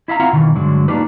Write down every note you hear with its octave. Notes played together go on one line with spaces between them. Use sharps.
E4 E5 F5 A#5
C4 E4 F4 F5 F#5 A#5
B2 D#3 E3
G2 D3 F#3 G#3
A#3 D4 D#4 F4 G4 B4